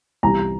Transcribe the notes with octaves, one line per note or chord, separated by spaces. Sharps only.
C2 C3 E3 A#5